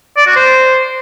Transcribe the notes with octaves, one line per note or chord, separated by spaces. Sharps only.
D5
F#4
C5